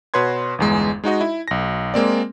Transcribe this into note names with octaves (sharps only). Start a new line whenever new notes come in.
B2 F#4 B4 C#5 C6 G#6
G1 E2 G#3
G#3 D#4 F#4 D#5
E4
B1 A#6
G#3 A#3 C4 D5